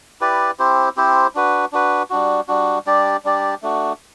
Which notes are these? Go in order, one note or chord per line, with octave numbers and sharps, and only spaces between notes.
E4 G4 B4 D5
C4 E4 G4 C5
C4 E4 G4 C5
D4 F#4 B4
D4 F#4 B4
G3 D4 F#4
G3 D4 F#4
G3 D4 G4 D5
G3 D4 G4 D5
A3 D4 F#4